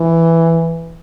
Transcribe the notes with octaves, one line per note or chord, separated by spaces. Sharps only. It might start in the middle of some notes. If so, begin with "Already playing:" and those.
Already playing: E3